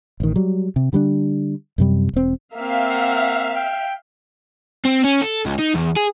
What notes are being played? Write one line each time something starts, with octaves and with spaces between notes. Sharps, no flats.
A1 D#3
F#3 G3
C3
D3 G3 B3 D4
F#2 C3 G3
E1 C4
A#3 C4 E5 F5
F#5
G5
C4
C#4
A4
C#2
D#4
E2
G#4